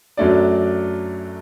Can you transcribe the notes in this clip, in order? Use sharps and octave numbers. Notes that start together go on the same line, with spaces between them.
F#2 F#3 A3 D4 D5